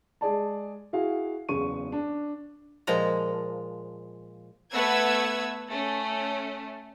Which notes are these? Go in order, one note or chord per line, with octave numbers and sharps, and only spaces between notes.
G#3 G#4 D5 A5
E4 F#4 G#4 F5
F#1 E2 C#3 C#6 D#7
D4
A#2 F3 G#3 A#5
A3 B3 B4 F#5 E6 G#6
A3 C#4